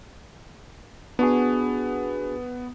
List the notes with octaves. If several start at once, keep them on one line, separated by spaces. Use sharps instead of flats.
B3 D4 F#4 G#4